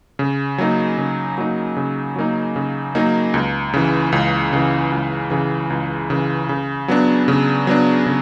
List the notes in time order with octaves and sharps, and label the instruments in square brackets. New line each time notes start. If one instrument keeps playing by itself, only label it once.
[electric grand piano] C#3
F#3 A#3 D#4
C#3
F#3 A#3 D#4
C#3
F#3 A#3 D#4
C#3
F#3 A#3 D#4
C#2
C#3 E3
C#2
C#3 E3
C#2
C#3 E3
C#2
C#3 E3
C#3
F#3 B3 D4
C#3
F#3 B3 D4
C#3